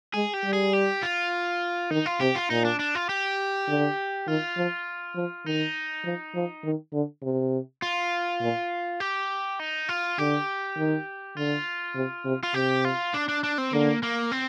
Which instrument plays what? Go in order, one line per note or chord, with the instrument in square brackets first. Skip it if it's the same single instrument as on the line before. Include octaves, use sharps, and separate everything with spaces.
[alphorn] G#3 [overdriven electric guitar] G#4
[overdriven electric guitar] G4
[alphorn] G3
[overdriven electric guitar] G#4
G4
F4
[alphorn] D#3 [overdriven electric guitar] D#4
[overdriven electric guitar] F4
[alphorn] C3 [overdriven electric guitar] G4
[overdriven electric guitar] F4
[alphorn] A#2 [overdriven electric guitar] D#4
[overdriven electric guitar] D4
D4
F4
G4
[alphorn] D3
[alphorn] D#3 [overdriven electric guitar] F4
[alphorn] F3
F3
[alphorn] D#3 [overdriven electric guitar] D#4
[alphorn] F3
F3
D#3
D3
C3
[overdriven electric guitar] F4
[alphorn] A#2
[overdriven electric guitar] G4
D#4
F4
[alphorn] D3 [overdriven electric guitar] G4
[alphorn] D#3
[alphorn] D3 [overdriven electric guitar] F4
[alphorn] C3
C3
[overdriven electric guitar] F4
[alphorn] C3 [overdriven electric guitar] G4
[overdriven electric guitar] F4
D4
D4
D4
C4
[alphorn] D3 [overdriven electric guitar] A#3
[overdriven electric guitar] A#3
C4